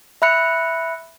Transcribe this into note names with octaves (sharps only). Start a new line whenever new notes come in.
E5 B5 F#6 C#7